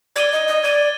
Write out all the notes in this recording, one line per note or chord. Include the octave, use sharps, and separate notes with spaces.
D5 G#6 D#7 G7
D#5
D#5
D5 G#6 D#7 G7